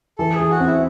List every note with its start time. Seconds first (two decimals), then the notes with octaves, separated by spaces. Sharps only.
0.18 E3 A4
0.34 G#4
0.40 E3
0.51 F#4
0.60 C4
0.66 E4